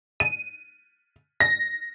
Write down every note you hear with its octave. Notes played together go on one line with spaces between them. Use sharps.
D#7
A#6